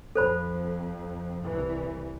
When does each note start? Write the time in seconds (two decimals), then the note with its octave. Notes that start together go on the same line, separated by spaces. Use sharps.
0.16 F2 A4 C5 B5
1.44 C2 E3